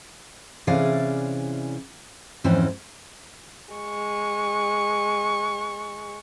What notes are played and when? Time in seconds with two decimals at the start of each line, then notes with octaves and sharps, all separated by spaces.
0.67 C3 E3 C#4 G#4 D5 F5
2.44 F2 G#2 E3 C4 C#4
3.74 G#3 C#6